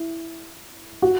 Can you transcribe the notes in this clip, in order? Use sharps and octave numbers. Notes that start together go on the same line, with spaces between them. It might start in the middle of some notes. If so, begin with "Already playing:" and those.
Already playing: E4
F#4